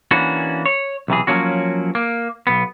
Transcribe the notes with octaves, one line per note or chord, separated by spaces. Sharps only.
E3 A#3 C#4 D4 F#4
C#5
B1 C3 E3 G#4
F3 F#3 A#3 C#4 F#4
A#3
B1 B3